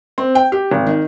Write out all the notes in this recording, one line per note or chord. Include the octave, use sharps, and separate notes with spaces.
C4
G5
G4
G#1
D#3